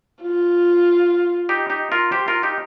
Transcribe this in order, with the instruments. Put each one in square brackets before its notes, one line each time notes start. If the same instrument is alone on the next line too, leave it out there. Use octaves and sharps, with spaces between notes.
[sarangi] F4
[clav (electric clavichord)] D#4 G4
D#4 G4
F4 A#4
G4 C5
F4 A#4
D#4 G4